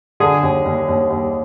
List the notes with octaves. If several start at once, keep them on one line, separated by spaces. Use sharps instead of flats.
D3 G#4
D#2
D#2
D#2
D#2